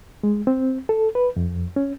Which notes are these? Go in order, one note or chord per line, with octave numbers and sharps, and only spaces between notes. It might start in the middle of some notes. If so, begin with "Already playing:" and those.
G#3
C4
A4
B4
F2
C#4